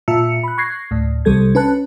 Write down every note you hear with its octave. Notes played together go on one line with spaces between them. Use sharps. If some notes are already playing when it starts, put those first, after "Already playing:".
A#2 F4 E5 A5 E6 C#7
B5 F#6
C#6 F#6 G#6 A#6 C7
D2 A2
C2 C3 G3 A4 G#6
C#4 B4 A5 F#6